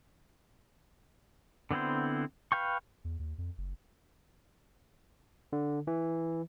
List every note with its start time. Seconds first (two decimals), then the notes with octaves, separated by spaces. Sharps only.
1.71 D3 B3 C4 E4 C5
2.52 B4 F5 G5 C#6
3.05 E2
3.19 D#2
3.38 F2
3.58 F#1
5.53 D3
5.87 E3